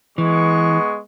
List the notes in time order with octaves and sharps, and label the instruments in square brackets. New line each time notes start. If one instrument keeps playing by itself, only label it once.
[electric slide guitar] E3 [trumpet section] G#3 B3 C#6